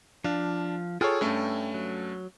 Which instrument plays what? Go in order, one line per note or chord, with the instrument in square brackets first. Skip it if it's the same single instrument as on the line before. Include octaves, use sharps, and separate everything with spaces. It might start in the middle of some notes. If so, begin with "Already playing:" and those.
[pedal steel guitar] F3 F5 [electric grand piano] D4
[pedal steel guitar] F4 G5 F6 [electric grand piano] G#4 A4 C#5
[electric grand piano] G2 A3 C#4 [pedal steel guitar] G5
[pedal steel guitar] F#3